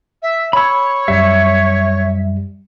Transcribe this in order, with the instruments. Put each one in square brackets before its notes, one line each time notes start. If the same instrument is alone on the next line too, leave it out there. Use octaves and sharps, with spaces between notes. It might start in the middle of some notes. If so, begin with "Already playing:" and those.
[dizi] E5
[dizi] C#5 [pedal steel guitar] B5 E6
[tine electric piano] F#2 G3 [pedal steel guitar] E5